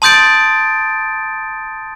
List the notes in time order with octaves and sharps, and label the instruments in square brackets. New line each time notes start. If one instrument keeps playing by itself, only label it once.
[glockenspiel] A5 C6 D#6 G6 A6 D7